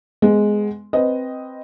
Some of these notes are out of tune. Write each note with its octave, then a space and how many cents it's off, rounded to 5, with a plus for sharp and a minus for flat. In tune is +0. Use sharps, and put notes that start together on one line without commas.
G#3 +0 B3 +25
C4 +0 B4 +0 D#5 +0